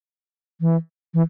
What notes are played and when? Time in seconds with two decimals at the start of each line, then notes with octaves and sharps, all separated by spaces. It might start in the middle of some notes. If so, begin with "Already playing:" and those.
0.61 E3
1.14 E3